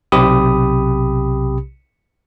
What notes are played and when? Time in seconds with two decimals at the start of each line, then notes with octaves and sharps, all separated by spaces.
0.12 B1 C3 G4 B5 D#6